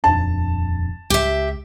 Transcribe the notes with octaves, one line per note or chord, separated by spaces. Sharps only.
D#1 F2 D4 A5
C#2 G4 E5